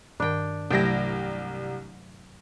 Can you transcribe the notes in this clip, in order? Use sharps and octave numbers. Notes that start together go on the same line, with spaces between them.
G2 D#3 D4 A#4 G5
C2 C3 F#3 A3 E4 G4 G5 A#6